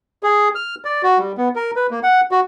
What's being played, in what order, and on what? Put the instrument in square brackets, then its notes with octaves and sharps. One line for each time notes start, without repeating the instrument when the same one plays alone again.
[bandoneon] G#4
F6
D5
F#4
G3
B3
A#4
B4
A#3
F#5
F#4